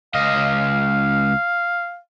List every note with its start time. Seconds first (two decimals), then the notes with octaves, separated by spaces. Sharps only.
0.15 C#2 D#5 F5